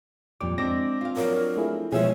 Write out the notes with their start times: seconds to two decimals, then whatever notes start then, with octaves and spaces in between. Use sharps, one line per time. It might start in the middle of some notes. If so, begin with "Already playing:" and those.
0.41 F2 A#2 G3 D6
0.58 G#3 C4 D4 D6 A#6
1.01 F4 F5
1.16 F3 F#3 D4 A#4
1.57 A3 E4 G#4
1.92 B2 F3 G#3 G#4 C5 C#5 E5 G#5